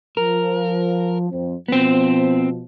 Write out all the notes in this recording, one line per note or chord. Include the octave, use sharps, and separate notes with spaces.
F3 A#4
F2 C4
B2 F3 B3 C4